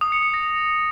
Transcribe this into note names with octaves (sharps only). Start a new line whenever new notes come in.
D#6
C#7
C#7
A#6